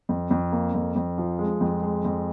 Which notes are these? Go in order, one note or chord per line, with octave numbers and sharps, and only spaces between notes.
F2
F2
A#3
F2
F2
F3
G#3
F2
G#3
F2